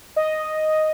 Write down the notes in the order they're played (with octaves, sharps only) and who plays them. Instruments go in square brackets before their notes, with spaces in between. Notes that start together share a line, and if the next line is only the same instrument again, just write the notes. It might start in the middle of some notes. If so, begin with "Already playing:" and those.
[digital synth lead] D#5